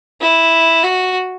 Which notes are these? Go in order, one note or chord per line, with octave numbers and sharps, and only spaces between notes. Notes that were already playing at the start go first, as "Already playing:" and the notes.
E4
F#4